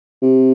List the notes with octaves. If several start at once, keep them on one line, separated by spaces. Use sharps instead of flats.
C3